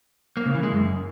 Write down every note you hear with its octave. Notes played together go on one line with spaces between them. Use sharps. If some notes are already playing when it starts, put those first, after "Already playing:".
A#3
C#3
E3
G#3
F#2